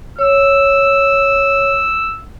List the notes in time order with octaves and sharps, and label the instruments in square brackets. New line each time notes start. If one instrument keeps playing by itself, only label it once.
[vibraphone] C#5 [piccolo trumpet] E6